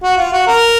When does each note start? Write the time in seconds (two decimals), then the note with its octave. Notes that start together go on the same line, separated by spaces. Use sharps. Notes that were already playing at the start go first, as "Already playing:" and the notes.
0.03 F#4
0.18 F4
0.32 F#4
0.47 A#4